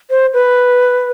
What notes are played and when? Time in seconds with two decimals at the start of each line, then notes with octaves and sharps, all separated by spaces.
0.10 C5
0.34 B4